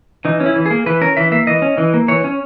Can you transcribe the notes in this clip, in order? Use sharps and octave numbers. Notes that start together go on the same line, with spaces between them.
E3 D#4
C#4
E4
E3
G#4
A#3
E3 B4
C#4 A#4
E3 E5
A#3 E5
E3 D#5
C#4
E3
A#3
E3 C#5
C#4